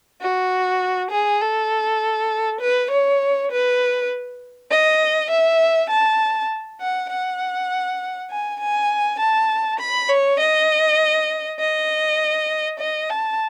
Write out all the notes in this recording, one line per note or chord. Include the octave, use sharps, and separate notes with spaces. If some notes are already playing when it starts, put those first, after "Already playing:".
F#4
G#4
A4
B4
C#5
B4
D#5
E5
A5
F#5
F#5
G#5
G#5
A5
B5
C#5
D#5
D#5
D#5
A5